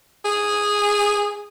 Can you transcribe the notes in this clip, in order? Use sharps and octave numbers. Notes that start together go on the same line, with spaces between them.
G#4